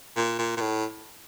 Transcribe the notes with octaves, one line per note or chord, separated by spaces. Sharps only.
A#2
A#2
A#2
A2